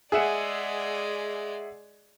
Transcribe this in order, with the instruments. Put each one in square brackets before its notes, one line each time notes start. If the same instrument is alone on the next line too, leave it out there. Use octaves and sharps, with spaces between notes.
[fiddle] G#3 D5 [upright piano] G#4 E5 F#5